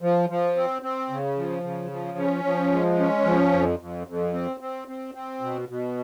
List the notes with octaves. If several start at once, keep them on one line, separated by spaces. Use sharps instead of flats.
F3
F3
C4
C4
C#3
F3
C#3
F3
C#4
F3
G#3
C#4
F3
F2
F2
F2
C4
C4
C4
C4
B2
B2